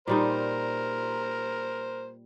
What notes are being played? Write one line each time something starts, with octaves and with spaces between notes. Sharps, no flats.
A#2 G3 D#4 A#4 C5